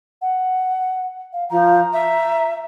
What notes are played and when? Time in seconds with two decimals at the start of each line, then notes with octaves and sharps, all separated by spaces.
0.22 F#5
1.33 F5
1.50 F3 A#5
1.93 E5